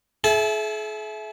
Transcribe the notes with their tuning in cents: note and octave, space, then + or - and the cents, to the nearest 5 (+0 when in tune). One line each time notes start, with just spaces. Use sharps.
E4 +0 G#4 +45 A5 -25